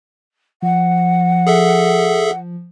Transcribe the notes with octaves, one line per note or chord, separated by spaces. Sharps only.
F3 F#5
G#4 A4 E5